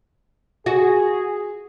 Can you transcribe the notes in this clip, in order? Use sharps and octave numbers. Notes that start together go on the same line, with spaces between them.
F#4 G#4